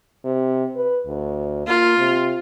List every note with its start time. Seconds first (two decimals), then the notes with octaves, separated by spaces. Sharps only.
0.25 C3
0.75 B4
1.07 D2
1.68 A#3 F4
1.98 C3